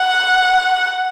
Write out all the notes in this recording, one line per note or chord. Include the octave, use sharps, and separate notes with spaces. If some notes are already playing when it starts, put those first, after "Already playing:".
Already playing: F#5